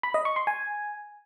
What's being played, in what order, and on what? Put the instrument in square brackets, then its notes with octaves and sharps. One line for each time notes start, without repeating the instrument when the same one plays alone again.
[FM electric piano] B5
D#5
C#6
C6
G#5